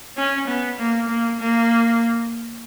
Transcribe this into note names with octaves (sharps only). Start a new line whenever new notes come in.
C#4
B3
A#3
A#3
A#3